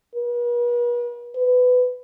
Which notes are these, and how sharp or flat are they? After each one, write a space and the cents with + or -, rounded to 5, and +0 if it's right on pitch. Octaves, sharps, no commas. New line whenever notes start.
B4 -45
B4 +15